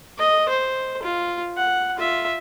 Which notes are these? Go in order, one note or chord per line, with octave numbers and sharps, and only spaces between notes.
D#5
C5
F4
F#5
F4 E5